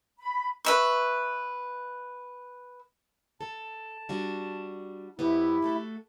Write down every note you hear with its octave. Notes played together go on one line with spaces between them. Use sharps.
B5
B4 E5 C#6
A4 A5
G3 D4 F#4
F2 B3 E4 G4
A3 F#4 A4